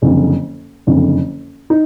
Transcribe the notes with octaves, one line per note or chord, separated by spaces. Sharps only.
F#1 F2 D3
F#1 F2 D3
D#4